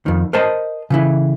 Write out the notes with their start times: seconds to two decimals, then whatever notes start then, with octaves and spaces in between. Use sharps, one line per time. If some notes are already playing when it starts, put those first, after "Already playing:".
0.06 F2 D#3
0.33 A#4 C5 D#5 A5
0.90 C#3 E3 E4